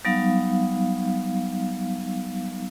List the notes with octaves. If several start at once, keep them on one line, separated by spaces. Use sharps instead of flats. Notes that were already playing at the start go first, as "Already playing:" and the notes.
F#3 G3 B3 D#4 F5